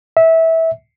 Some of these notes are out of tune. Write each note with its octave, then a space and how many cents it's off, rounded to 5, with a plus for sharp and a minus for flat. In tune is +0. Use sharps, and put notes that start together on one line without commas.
E5 -20